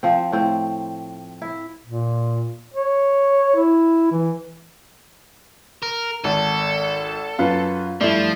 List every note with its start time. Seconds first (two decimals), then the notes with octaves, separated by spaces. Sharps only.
0.03 F3 C4
0.32 A2 C4
1.42 E4
1.85 A#2
2.74 C#5
3.56 E4
4.11 E3
5.82 A#4
6.24 G#1 A4
7.39 F#2 F4 B4
8.01 G2 F3 A3 E4 D5